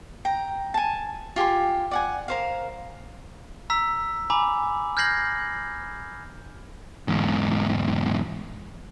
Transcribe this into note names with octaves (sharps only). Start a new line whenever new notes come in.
G5 A#5
G#5 A5
F4 G4 G#5 C6
D5 F#5 G#5
A#4 C5 F5
A#5 E6 B6
G#5 A#5 B5 D6
F6 G6 G#6 A#6 C7 F#7
E2 G#2